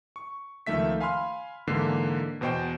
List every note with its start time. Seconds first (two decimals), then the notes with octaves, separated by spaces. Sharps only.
0.16 C#6
0.67 C#2 D#3 F3 A3 E5 B6
1.00 F5 G#5 B5 C6 F6
1.67 G#2 D3 E3 A#3 C7
2.41 E2 B2 C5 D#5 G5